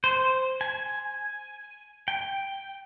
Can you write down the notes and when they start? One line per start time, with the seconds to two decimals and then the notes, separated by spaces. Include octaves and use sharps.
0.04 C5
0.61 G#5
2.08 G5